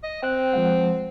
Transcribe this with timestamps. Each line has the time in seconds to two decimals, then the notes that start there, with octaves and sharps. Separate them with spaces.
0.03 D#5
0.22 C4 G5 F#6
0.53 F3 G#3 F#5